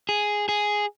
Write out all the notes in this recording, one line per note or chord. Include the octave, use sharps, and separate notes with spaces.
G#4
G#4